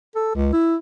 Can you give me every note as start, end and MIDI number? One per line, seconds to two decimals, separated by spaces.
0.15 0.34 69
0.36 0.52 37
0.53 0.75 64